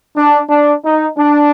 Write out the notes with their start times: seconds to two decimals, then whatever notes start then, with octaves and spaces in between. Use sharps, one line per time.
0.17 D4
0.50 D4
0.85 D#4
1.18 D4